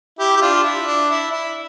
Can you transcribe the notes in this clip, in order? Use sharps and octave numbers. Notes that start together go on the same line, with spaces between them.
E4 G4
G4
D4 F4
E4
D4
E4
E4